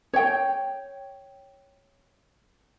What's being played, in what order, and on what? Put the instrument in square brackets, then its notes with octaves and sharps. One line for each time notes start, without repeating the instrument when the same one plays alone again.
[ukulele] C#5 G5